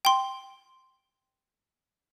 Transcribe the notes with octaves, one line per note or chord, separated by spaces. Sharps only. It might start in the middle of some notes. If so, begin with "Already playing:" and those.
G5 C6